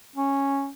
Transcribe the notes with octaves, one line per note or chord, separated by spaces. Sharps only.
C#4